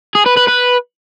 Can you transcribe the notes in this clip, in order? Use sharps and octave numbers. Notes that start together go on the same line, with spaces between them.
G#4
B4
B4
B4